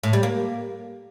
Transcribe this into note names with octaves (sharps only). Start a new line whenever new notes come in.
A2
G3
A#3